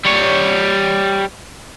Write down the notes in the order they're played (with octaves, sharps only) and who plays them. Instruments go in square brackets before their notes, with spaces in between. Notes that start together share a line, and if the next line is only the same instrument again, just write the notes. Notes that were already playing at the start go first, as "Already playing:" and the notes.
[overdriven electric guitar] G3 C#5